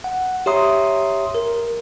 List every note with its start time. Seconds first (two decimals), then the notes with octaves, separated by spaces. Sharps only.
0.04 F#5
0.46 G4 C#5 E5 A#5 C6 D#6
1.35 A#4